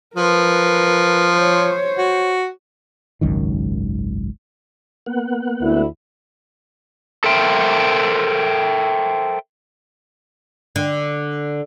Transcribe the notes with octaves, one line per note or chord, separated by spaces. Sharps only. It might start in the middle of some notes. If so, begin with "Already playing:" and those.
F3 A#4 B4
C5 C#5
F#4
G#1 C#2 F#2 D#3
A#3 B3 F#5
D2 E4
A4 A#4 C5 E5 G5
D3